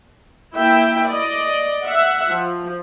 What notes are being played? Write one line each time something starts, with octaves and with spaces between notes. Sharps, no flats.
A#3 E4 E5 G5
D5 D#5
E5 F#5
F3